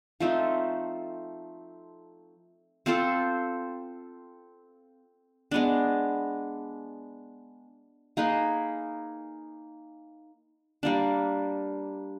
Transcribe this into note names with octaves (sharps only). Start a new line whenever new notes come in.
F3 A3 C4 D#4
C4 F4 A4 C5
G#3 B3 D4
A#3 D#4 G#4 B4
G3 A#3 D4